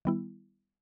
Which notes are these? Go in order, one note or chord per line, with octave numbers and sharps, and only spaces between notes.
D#3 G3 B3 E4